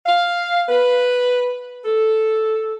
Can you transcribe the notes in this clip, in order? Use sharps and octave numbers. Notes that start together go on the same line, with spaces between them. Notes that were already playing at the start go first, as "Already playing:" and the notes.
F5
B4
A4